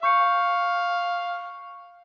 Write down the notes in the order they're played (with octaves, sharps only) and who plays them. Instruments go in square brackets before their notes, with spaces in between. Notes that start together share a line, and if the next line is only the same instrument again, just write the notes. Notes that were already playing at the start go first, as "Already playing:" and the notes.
[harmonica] F5 [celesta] C#6 G6 C#7